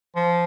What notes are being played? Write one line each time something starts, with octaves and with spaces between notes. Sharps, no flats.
F3